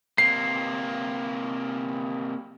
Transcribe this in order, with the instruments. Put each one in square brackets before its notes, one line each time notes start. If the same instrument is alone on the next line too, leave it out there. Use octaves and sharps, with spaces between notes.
[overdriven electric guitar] C3 A#3 [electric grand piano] C7